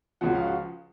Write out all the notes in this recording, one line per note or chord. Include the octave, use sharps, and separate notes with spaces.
C#2 C#3 F3 F#5
F5
F#4